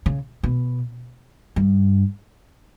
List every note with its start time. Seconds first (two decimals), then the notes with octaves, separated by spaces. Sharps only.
0.06 C#3
0.43 B2
1.56 G2